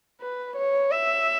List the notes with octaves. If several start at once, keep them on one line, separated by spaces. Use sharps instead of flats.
B4
C#5
E5